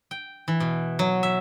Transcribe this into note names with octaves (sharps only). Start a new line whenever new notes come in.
G5
E3
B2
F#3
E5